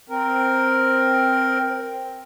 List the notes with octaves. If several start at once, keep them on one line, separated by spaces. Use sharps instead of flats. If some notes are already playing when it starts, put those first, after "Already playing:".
C4 A#4